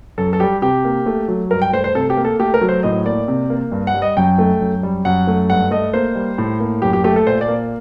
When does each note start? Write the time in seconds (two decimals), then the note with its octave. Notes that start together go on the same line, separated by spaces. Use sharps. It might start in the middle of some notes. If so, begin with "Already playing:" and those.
0.18 F#2 A4
0.33 A4
0.40 G3 G4
0.62 C3 G4
0.85 A#3
1.06 A3
1.28 F#3
1.51 G2 A#4
1.62 G5
1.73 A3 C5
1.84 C5
1.95 C3 A4
2.10 G4
2.17 A#3
2.25 A4
2.39 A3 G4
2.54 A#4
2.61 F#3
2.69 C5
2.83 A2 D#5
3.06 A#3 D5
3.28 C3
3.50 A#3
3.72 G2
3.87 F#5
3.94 G3
4.02 D#5
4.17 F#2 G5
4.38 A3
4.61 F#2
4.83 G3
5.05 F#2 F#5
5.27 A3
5.50 G2 F#5
5.71 A3 D#5
5.93 A#3 C5
6.15 G3
6.38 A2
6.60 A#3
6.82 F#2 G4
6.93 G4
7.04 A3 G4
7.16 A4
7.27 A#2 C5
7.41 D5
7.48 A#3